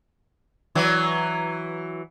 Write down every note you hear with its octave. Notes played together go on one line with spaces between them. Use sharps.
E3 F#3